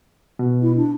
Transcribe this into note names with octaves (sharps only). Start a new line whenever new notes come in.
B2
E4
D4